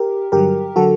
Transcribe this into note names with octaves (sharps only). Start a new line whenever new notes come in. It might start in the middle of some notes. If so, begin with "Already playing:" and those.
Already playing: G4 A#4
G2 D3 F#3 G4 A#4
D3 F#3 F#4 A4